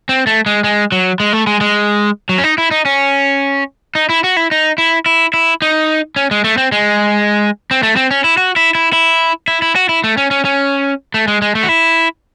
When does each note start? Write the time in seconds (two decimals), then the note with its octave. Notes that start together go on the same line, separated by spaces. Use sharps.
0.09 C4
0.27 A3
0.46 G#3
0.64 G#3
0.92 F#3
1.20 G#3
1.33 A3
1.47 G#3
1.61 G#3
2.29 F#3
2.38 C#4
2.44 D#4
2.58 E4
2.71 D#4
2.85 C#4
3.95 D#4
4.09 E4
4.24 F#4
4.37 E4
4.51 D#4
4.78 E4
5.06 E4
5.34 E4
5.62 D#4
6.16 C#4
6.31 G#3
6.44 A3
6.58 C4
6.72 G#3
7.71 C4
7.83 A3
7.96 C4
8.11 C#4
8.24 E4
8.37 F#4
8.56 E4
8.75 E4
8.93 E4
9.48 E4
9.62 E4
9.76 F#4
9.89 E4
10.04 A3
10.17 C#4
10.31 C#4
10.45 C#4
11.14 A3
11.28 G#3
11.42 G#3
11.55 A3
11.63 F#4
11.69 E4